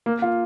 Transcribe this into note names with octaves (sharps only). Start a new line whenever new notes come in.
A#3
F4